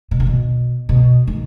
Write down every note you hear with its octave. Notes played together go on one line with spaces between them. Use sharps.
B2
C3
B2
B2
D#3